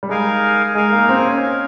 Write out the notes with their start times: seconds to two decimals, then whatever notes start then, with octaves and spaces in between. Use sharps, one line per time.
0.03 G3
0.09 G#3 D#4 A#4 F5 G#5
0.75 G#3 D#4 A#4 F5 G#5
0.92 A#3
1.09 C4
1.25 C#4
1.42 D#4 A#4 F5 G#5